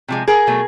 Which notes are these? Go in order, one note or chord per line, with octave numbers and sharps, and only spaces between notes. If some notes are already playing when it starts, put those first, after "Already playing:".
C3 F3 G#3
G#4 A#4
B2 F#3 A3